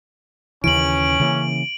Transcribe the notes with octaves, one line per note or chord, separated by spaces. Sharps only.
D#2 C#3 E3 C#4 D7 F#7
C#3 E3 A#3